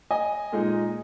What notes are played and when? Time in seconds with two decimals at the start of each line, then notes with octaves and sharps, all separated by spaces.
0.11 D#5 G#5
0.52 A#2 G#3 D#4